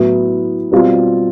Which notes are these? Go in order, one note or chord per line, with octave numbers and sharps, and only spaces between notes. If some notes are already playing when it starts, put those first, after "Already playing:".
Already playing: A2 F#3 B3 E4
B2 G3 C4 F4